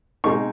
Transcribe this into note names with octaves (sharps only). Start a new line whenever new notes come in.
B2 G#3 C4 D#4 C#6